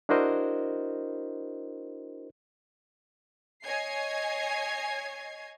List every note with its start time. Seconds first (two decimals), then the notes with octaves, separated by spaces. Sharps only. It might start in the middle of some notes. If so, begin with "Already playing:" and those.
0.09 D4 E4 F#4 A#4 C5 D#5
3.64 C#5 D#5 G#5 G#6 C7